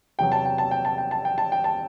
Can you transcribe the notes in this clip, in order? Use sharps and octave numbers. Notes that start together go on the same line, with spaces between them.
E2 C3 F#3 G5
A5
G5
A5
G5
A5
G5
A5
G5
A5
G5
A5